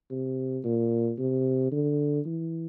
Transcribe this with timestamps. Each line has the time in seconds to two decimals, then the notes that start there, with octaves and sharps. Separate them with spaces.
0.10 C3
0.64 A#2
1.18 C3
1.72 D3
2.26 E3